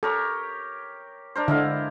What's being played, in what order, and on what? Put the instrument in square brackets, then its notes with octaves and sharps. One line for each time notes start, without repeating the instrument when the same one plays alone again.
[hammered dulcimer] G4 A#4 C#5 [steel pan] A4
[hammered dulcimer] D4 A#4 C5
[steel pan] D3 [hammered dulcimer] G#3 E4 F5